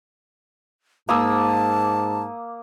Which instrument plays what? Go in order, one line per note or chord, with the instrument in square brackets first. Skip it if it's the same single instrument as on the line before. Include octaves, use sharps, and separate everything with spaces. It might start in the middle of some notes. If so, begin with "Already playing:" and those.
[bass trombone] G#2 [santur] A#3 D#6 E6 [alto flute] A5